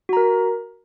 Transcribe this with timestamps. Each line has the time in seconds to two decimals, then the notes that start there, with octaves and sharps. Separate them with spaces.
0.09 F#4
0.13 A#5
0.17 A#4